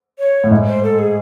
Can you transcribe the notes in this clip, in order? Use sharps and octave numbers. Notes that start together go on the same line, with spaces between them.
C#5
A2
G#2
C5
A4
G#4